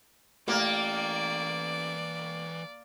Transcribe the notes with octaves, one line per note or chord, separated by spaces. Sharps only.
A1 E3 A#3 D5 G5